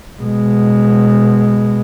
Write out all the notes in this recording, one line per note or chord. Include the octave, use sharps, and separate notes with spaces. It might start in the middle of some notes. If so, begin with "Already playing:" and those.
B2 G#3